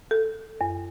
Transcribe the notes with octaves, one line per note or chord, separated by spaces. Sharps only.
A4
F#2